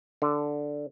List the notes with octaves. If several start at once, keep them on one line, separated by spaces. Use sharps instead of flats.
D3